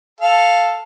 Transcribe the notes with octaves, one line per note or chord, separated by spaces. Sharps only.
A4 F5